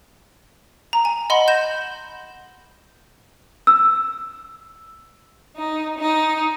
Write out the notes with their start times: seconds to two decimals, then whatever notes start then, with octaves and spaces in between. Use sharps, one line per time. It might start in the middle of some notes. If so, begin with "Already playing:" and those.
0.93 A#5
1.05 G#5
1.30 D#5 F#5 B5 C6
1.48 G6 A#6 E7
3.67 E6
5.56 D#4
5.98 D#4